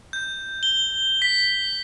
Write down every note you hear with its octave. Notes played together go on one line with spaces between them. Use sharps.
G6
G7
B6